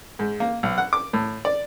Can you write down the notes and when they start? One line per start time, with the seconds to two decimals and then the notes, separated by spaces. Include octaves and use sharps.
0.19 G#2
0.40 A#3
0.63 B1
0.78 F#5
0.93 D6
1.13 A2
1.45 D5